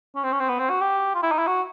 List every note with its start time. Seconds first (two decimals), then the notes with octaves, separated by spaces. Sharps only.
0.16 C#4
0.24 C4
0.32 C#4
0.40 C4
0.49 B3
0.59 C4
0.70 F#4
0.81 G4
1.15 F4
1.23 E4
1.32 D#4
1.39 E4
1.47 F#4